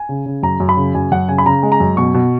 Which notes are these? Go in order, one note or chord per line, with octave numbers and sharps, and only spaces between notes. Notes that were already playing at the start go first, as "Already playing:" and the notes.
Already playing: G#5
C#3
C#3
F#2 A#5
F#2
B5
C#3
F#2 G#5
F#2 F#5
C#3 G#5
B5
C#3 A#5
G#3
A#5
F#2
B2 C#6
B2